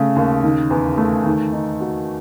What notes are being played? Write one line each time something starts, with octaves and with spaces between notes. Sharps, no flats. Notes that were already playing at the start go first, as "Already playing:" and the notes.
Already playing: C#3 A3
D#2
D#3
E2
A3
D#3
D#4
F#4